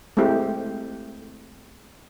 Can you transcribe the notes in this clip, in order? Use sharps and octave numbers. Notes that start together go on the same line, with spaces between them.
G#3 A3 C4 E4 G4